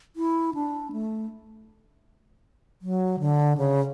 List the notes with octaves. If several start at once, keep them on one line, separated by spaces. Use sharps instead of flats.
E4
D4
A3
F#3
D3
C#3